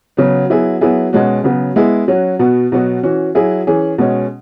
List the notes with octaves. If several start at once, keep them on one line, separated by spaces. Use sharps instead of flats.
C#3 F#3 B3
F#3 B3 E4 G#4
F#3 B3 E4 G#4
B2 G#3 C#4 F#4
C#3 F#3 B3
G#3 B3 E4 G#4
F#3 C#4 F#4
B2 B3 F#4
B2 F#3 B3 F#4
E3 C#4 F#4
F#3 E4 G#4
E3 C#4 G#4
B2 G#3 C#4